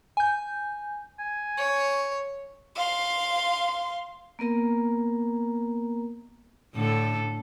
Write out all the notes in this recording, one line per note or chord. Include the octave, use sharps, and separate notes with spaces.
G#5 G6
G#5
C#5
F5 C6
A#3 B3 A#4 A#5
A2 D3 A4